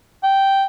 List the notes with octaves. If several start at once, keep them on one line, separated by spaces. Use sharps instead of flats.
G5